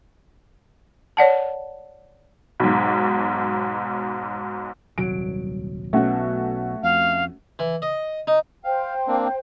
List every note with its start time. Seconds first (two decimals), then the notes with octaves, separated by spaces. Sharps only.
1.17 C#5 D5 F#5 A5
2.60 B1 G#2
4.98 D#1 C2 F#3 D7
5.93 B1 B2 A3 C#4 F#4
6.83 F2 F5
7.59 E3
7.82 D#5
8.27 D#4
8.64 C5 F5 G5
9.08 A#3 C4 D4